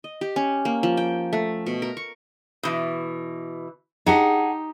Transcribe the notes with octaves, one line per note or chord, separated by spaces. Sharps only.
D#5
G4
C#4
A#3
F3
G5
A3
B2
A#4
C#6
B2 E3
D#4 G4 G#4 F#5 A5